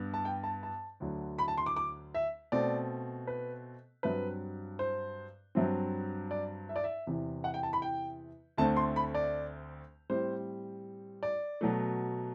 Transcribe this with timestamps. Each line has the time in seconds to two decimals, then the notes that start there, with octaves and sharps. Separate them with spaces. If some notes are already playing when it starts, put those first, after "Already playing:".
Already playing: G2 B3
0.14 A5
0.25 G5
0.44 A5
0.63 A5
1.00 D2 D3 F#3
1.38 B5
1.48 A5
1.57 C6
1.66 D6
1.76 D6
2.14 E5
2.52 B2 A3 C4 D5
3.27 B4
4.03 G2 F#3 C4 B4
4.79 C5
5.55 G2 F#3 C4
6.31 D5
6.69 E5
6.76 D5
6.84 E5
7.07 E2 C3 E3
7.44 F#5
7.54 G5
7.63 A5
7.73 B5
7.82 G5
8.57 D2 D3 A3 C4 A5
8.76 C6
8.96 B5
9.15 D5
10.10 A2 G3 C4 C5
11.23 D5
11.61 B2 F#3 A3